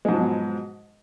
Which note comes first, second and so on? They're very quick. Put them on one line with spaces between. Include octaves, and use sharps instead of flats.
G#3 G#2 F3 F#3 B2